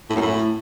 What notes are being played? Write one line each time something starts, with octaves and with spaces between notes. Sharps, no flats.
A2
F#2
A2